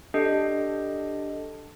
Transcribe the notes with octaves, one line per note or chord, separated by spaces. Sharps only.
D4 G4 A4 D#5